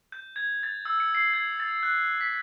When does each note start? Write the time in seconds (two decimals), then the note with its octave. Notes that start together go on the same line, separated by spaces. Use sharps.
0.12 G6
0.36 G#6
0.63 A6
0.85 E6
1.00 C#7
1.15 C7
1.34 G#6
1.60 A6
1.83 F#6
2.21 B6